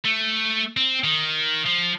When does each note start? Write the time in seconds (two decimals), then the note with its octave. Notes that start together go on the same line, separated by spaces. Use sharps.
0.05 A3
0.77 C4
1.04 D#3
1.66 F3